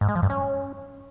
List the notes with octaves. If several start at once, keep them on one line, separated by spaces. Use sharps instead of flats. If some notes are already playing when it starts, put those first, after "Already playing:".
G#2
G#3
F3
G2
C#4